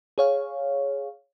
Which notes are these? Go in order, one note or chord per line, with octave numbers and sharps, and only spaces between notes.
G#4 C#5 F5